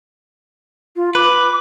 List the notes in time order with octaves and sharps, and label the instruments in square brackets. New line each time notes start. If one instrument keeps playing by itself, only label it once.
[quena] F4
[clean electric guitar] B4 [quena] D6